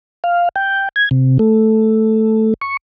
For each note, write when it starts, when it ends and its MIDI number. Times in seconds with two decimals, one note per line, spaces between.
0.24 0.49 77
0.56 0.89 79
0.96 1.09 92
1.11 1.38 48
1.39 2.54 57
2.61 2.77 85